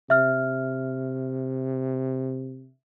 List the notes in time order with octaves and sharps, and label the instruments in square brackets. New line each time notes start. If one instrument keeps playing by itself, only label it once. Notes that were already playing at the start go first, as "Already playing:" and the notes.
[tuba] C3 [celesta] E5 F6